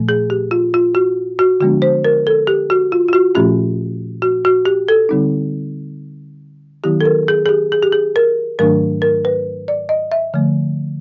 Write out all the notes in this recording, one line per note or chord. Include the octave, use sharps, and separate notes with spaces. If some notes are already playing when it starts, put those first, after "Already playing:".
Already playing: A#2 F3 A3
G#4
G4
F4
F4
F#4
F#4
D3 F3 G#3 B3 D4 F#4
C5
A#4
A4
G4
F#4
F4
F4
F#4
A#2 F3 A3 C#4 F4 G4
F#4
F#4
G4
A4
D3 G3 C4 D#4
D#3 F#3 B3 E4 G4
A4
A#4
G#4
G#4
G4
G#4
G4
G#4
A#4
G#2 D#3 F#3 A3 D4 A#4
A#4
B4
D5
D#5
E5
D3 F3 A3